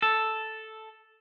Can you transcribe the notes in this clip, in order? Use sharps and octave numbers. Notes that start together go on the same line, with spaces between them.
A4